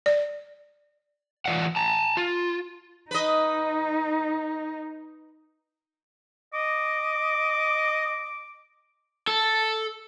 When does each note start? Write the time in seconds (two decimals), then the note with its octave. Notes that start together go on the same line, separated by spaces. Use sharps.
0.06 D5
1.46 E3 F4 D5 F5 F#5
1.76 A5 A#5
2.17 F4
3.11 D#4 B4 D#5
6.54 D#5 D6
9.27 A4